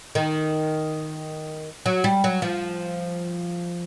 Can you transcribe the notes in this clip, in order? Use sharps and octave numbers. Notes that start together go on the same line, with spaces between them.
D#3
F#3
G3
F#3
F3